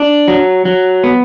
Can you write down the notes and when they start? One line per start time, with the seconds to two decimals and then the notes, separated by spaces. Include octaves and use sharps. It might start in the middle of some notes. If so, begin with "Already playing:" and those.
Already playing: D4
0.28 F#3
0.65 F#3
1.04 B3